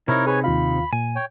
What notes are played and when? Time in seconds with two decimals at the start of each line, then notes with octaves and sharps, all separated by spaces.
0.08 C3 C4 D#4 E4 A#4 C#5
0.27 G#4 B4 C#5 G#5 B5
0.44 D#2 F4 F5 B5
0.93 A#2 G#5
1.15 C#5 G5